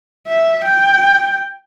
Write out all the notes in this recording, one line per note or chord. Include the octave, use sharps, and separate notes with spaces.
E5
G5